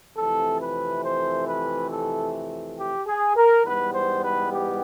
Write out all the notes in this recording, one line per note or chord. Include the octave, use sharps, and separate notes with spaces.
F2 C3 E3 A3 A4
B4
C5
B4
A4
G4
G#4
A#4
G#2 E3 G3 B3 B4
C5
B4
G4